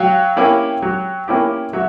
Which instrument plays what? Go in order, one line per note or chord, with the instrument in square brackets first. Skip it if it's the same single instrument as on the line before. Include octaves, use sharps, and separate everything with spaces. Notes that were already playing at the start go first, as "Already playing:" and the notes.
Already playing: [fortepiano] F#3 [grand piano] F5 G5
[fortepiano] A#3 C#4 E4 G4
F#3
A#3 C#4 E4 G4
[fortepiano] F#3 [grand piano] E5 F#5